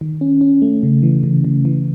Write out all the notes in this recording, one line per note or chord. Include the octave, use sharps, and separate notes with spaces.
D#3
C#4
C#4
A3
C#3
E3
C#3
C#3
E3